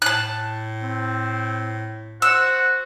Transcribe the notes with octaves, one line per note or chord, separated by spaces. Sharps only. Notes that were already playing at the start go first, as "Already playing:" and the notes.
A2 A5 F#6
C4
F#4 C5 E6